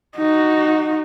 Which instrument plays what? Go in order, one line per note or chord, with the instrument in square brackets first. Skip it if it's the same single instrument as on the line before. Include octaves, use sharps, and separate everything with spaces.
[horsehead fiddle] D#4 F#4